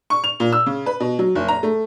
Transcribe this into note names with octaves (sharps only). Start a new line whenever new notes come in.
C#6
F7
A#2
E6
C#3
B4
B2
F#3
F#1
A#5
A3